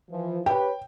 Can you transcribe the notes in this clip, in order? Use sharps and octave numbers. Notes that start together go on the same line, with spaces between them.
E3 F3
G4 B4 C#5 G5